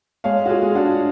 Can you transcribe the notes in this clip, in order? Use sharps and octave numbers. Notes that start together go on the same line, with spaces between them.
G#3 C#5 F5
F#4
F4 G#4
G#3
D4 F#4